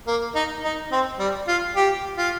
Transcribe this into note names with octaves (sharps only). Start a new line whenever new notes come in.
A#3
D#4
D#4
C4
G3
F4
G4
F4